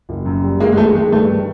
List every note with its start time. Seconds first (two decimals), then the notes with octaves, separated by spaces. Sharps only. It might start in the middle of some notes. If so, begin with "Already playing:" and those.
0.09 F#1
0.26 F#2
0.43 G3
0.60 G1 G#3 A#3
0.72 G#3
0.77 D#3 A3
0.95 D#3 G#3
1.12 G2 A3
1.29 D#3